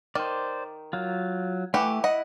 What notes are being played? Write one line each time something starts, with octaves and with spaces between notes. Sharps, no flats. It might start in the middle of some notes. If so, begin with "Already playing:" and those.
D#3 C5 D5
F#3 F4
E3 A3 G4 F#5 D6
E4 D#5 F#5